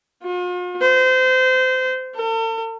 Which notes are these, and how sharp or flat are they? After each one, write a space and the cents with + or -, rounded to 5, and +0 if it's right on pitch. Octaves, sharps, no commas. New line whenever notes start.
F4 +45
C5 -25
A4 +45